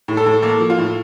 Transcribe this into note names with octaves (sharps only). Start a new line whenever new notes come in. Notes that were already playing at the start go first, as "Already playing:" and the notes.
A2
A4
A2
A#3 A4
F3
F4
A2